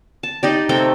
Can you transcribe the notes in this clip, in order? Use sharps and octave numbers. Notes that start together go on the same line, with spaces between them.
A5
D#4 G4 D5
C3 A3 G5